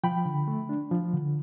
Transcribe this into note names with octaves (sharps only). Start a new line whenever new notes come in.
F3 G5 B5
D3
A3
D4
F3
D3